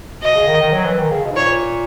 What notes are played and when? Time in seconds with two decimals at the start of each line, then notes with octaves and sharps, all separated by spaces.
0.22 B2 D#5
0.34 C#3
0.47 D#3
0.61 D#3
0.72 F#3
0.85 E3
0.99 D#3
1.11 C#3
1.24 B2
1.32 G#2
1.36 A#2 C#5